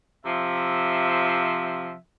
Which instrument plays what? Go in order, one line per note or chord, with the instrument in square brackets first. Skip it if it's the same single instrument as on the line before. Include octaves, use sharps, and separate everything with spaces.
[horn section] C3 F3 E5